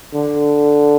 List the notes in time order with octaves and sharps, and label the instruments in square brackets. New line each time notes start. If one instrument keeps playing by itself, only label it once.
[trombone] D3